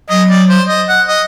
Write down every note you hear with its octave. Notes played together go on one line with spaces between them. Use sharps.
F#3 D#5
D5
C5
D#5
F#5
D#5